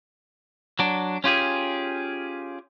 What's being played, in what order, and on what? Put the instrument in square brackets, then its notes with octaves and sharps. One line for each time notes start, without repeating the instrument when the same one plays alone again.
[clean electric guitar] F#3 D4
C#4 F4 G4 G#4